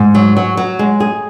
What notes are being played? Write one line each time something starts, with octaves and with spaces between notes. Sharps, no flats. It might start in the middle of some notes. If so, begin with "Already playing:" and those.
Already playing: G#2
F#3
F#3
F#3
G#3
G#4